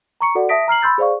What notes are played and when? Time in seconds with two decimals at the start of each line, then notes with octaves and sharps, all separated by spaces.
0.21 A#5 C#6 C#7
0.35 F#4 A4 D5 F#5
0.49 E5 A5 D#6 A#6 B6 D7
0.68 A#5 F6 C7 F#7
0.82 B5 C6 E6 G6 A6
0.98 G#4 C5 D5 F5 C#6